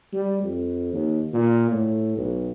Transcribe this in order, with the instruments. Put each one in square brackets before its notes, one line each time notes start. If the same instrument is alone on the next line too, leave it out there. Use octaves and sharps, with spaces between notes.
[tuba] G3
F2
D#2
A#2
A2
B1